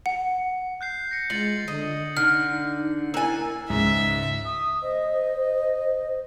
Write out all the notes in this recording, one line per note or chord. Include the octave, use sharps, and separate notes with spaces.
F#5
F#6 G6 C7
A#6 C#7
G#3 F4 A6 C#7 F#7
D3 D#5
D3 D#4 F6
A#3 E4 G#5 E6 F#6 A6
C#2 G#2 E5
D#6
C5 D#5